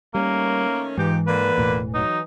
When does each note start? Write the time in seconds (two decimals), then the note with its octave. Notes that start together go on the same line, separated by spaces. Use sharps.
0.15 D#3 G3 A3 A#3 C#4
0.97 G#2 E3 D#4 F4 G4
1.27 D3 D#3 A#3 B4
1.58 E1 A2
1.94 F#3 D#4